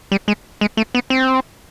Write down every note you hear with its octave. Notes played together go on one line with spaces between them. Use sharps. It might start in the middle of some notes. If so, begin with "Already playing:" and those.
G3
G#3
G#3
A3
B3
C4